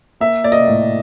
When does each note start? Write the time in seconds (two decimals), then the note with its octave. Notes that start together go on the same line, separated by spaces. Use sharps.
0.20 A#3 E5
0.44 A#3 D5
0.52 D#5
0.68 A2